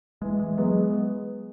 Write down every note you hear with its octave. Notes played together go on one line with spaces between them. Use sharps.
E3 G#3
G#3
F#3 G#3 B3